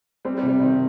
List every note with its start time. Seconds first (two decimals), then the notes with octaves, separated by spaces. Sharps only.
0.25 G3 C4
0.38 G3
0.43 C3
0.49 G3
0.61 C3 D#3